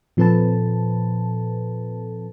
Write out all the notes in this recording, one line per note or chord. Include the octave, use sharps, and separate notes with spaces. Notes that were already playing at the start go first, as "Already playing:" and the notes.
A#2 F3 C4 A4 B4 A5